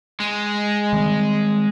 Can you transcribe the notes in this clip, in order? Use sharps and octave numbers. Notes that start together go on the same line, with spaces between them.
G#3
D#3 G3 C4